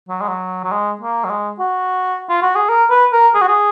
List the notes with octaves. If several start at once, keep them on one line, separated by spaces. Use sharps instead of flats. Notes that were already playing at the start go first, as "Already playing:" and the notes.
F#3
G#3
F#3
F#3
G#3
A#3
F#3
G#3
F#4
F4
F#4
G#4
A#4
B4
A#4
G#4
F#4
G#4